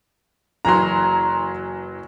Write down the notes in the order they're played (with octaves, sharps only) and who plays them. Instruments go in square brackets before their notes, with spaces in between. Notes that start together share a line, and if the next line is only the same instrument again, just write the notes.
[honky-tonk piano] F#1 E3 F#3 [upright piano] A#5 C6